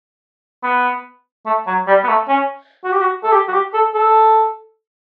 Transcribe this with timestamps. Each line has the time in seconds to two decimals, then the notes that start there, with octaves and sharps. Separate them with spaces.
0.63 B3
1.46 A3
1.67 F#3
1.87 G3
2.04 B3
2.08 A3
2.28 C#4
2.84 F#4
2.92 G4
3.01 F#4
3.24 A4
3.32 G4
3.48 F#4
3.52 G4
3.74 A4
3.94 A4